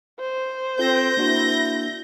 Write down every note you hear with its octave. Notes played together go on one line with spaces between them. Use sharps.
C5
C4 F4 A4 G6 A#6
A#3 D4 E4 F#4